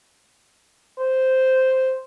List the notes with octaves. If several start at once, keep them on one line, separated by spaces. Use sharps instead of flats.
C5